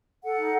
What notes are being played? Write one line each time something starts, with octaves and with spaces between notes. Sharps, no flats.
A4 F#5
D#4